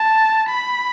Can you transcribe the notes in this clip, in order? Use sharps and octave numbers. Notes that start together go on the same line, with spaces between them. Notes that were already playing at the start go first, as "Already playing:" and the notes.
Already playing: A5
B5